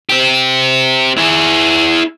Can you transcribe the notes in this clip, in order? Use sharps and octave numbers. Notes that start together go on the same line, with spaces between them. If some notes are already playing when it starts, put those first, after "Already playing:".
C4 G4
E4 G#4